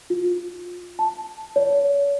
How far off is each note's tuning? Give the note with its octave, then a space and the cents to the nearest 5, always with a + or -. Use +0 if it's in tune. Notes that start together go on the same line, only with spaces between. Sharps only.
F4 +20
A5 +0
C#5 +35